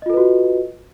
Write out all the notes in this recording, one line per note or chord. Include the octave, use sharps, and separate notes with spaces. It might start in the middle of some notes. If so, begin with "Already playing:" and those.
F4 F#4 A4 B4 D#5